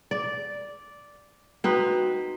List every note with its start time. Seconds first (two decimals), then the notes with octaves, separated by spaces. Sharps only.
0.11 D5
1.64 C4 D#4 F#4 B4